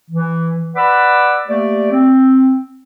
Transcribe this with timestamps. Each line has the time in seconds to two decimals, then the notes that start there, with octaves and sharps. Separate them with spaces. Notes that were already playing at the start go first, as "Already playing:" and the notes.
0.10 E3
0.75 B4 D5 F#5 B5 D6 E6
1.47 A3 A#3 G4 D5
1.91 C4